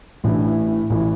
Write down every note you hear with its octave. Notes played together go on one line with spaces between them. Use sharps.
A1 A2 E3 D4
E4
E4
A1 A2 E3 E4